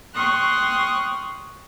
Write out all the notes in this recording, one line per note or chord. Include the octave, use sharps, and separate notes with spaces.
G5 C6 C#6 D#6 F6 F#6